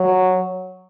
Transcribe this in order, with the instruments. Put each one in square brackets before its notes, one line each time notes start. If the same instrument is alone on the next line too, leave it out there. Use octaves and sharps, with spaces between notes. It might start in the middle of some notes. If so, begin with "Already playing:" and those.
Already playing: [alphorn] F#3